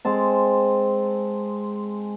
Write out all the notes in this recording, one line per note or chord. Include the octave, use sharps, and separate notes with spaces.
G#3 C4 A5